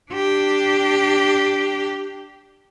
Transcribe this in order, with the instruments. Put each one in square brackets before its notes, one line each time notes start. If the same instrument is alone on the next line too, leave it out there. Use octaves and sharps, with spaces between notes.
[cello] D4 G4